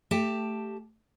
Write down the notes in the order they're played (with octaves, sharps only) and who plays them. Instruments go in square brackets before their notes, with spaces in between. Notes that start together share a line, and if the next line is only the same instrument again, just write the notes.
[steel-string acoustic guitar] A3 G4 A5